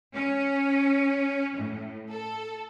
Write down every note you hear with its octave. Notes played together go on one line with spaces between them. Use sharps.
C#4
A2
A4